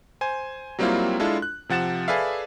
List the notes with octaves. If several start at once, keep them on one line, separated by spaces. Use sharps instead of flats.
C5 G#5
F#3 G3 A#3 C4 E4 F4
G#3 D4 E4 F4 A4
F#6
C3 F3 F#5 A6 E7
G#4 A4 B4 D5 E5 F5